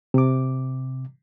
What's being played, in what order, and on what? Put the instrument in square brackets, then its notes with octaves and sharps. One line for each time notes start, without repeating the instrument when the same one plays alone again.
[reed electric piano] C3 D6